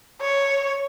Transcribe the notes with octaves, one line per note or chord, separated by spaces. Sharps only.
C#5